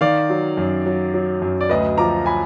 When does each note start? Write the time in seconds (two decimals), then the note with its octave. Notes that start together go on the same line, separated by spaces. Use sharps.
0.01 D#3 D5 F5
0.30 F#3
0.57 F#2
0.86 F#3
1.14 F#3
1.42 F#2
1.61 D5
1.69 D2 B4 D#5
1.98 F3 A#5 D6
2.26 G#5 B5